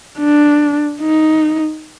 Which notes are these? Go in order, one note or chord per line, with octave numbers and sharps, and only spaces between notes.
D4
D#4